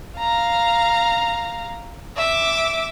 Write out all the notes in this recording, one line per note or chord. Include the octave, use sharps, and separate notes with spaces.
F5 A#5
E5 D6